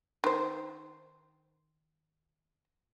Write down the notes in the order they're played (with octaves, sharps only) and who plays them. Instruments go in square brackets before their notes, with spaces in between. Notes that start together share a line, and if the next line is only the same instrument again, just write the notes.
[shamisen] D#3 C5